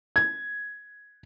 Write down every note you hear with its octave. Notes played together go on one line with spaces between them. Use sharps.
G#6